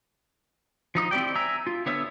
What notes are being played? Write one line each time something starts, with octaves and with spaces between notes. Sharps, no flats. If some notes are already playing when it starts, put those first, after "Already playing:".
F3 D#4 D#6
C4 E4 G4 D5 G5
E5 G#5 A#5 E6
F4
D3 B3 C#5 E5 E6